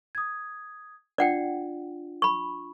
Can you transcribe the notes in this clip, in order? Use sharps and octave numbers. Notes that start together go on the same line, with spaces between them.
D#6 G#6
D4 F4 D5 F#5 G5
B5 C#6